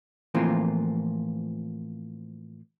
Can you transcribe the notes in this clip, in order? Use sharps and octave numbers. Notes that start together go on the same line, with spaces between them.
A2 E3 F3 A#3 C4 F4